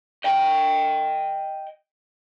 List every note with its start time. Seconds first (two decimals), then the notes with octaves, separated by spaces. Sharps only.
0.24 D#5 G5